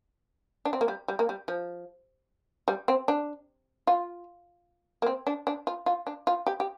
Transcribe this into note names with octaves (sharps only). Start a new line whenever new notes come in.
D4
C4
A#3
G3
G3
A#3
G3
F3
G3
C4
D4
F4
A#3
C4
D4
D4
F4
F4
D4
F4
G4
G4